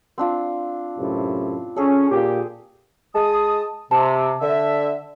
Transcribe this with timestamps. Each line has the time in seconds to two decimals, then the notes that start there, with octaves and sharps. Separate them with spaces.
0.18 C4 D4 F4
0.98 F#2 A2 C3
1.76 C#4 G#4 A4
2.11 A#2 G4
3.15 G#3 A5 D#6
3.91 C3 A5
4.41 D3 E5